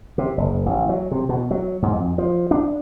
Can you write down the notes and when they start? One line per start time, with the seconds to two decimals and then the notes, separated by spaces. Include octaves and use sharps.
0.18 C3
0.38 F#1
0.66 A1
0.89 F#3
1.11 C3
1.29 B2
1.51 F#3
1.82 G#2
1.96 F2
2.18 F3
2.51 D4